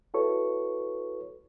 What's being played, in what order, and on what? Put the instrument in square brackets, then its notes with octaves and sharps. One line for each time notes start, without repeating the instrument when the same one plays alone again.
[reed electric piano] E4 F#4 A4 B4 C#5 C#6